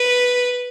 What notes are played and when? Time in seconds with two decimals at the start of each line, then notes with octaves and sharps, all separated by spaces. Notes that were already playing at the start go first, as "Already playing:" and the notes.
Already playing: B4